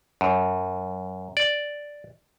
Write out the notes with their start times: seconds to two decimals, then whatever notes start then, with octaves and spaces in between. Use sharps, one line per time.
0.21 F#2
1.37 D5